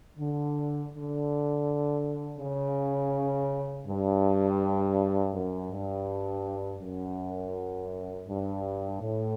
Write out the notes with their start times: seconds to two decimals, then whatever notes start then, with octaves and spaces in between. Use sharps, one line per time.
0.18 D3
0.92 D3
2.38 C#3
3.85 G2
5.33 F#2
5.70 G2
6.80 F#2
8.27 G2
9.00 A2